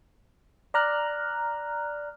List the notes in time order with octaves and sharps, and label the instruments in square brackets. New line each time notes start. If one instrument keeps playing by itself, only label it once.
[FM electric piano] D5 A#5 F6 F#6